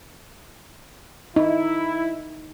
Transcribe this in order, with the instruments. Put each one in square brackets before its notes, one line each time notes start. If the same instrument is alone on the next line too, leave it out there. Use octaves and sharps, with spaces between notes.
[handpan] D#4 [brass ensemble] E4